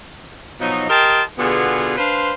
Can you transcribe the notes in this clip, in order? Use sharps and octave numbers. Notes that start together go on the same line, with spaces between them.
B2 F3 F#3 D#4
G4 A#4 D#5 G5 A5 C6
B2 D3 B3 F4 G#4
D4 B4 C5 F5 C6